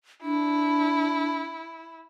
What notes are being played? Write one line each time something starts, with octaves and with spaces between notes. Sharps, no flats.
D4 E4